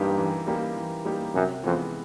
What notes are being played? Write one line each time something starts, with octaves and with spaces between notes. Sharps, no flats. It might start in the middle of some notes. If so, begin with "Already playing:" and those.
Already playing: G2 E3 G3 A#3 D#4 G4
E3
G3 A#3 D#4 G4
E3
G3 A#3 D#4 G4
F#2 C3
F2 E3 G#3 B3